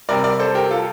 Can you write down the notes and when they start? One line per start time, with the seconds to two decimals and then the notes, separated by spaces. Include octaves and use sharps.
0.08 C3 G3 A#4 D5
0.24 A#4 D5
0.39 A4 C5
0.55 G4 A#4
0.71 F4 A4